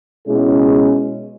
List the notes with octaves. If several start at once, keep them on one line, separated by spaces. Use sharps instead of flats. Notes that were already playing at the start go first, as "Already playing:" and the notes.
B2 G#3 C#4 E4 G#4